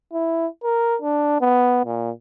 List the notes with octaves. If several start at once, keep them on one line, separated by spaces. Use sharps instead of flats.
E4
A#4
D4
B3
A#2